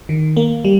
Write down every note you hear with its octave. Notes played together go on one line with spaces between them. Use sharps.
D#3
A#3
G3